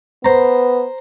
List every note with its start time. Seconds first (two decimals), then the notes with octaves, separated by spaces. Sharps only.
0.25 B3 C5 A#5